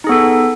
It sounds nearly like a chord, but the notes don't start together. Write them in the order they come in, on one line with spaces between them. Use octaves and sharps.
D#4 G#4 B3 A4